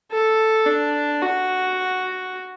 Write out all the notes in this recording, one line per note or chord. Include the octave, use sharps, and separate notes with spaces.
A4
D4
F#4